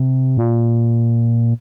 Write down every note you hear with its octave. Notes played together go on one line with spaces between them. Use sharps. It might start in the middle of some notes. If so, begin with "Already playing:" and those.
Already playing: C3
A#2